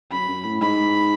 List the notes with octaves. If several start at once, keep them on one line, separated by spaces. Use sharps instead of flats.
F#2 B5
F#2
A2
G#2 B5